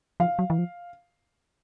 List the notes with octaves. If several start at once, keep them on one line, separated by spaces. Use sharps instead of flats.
F3 F5
F#3
E3
F3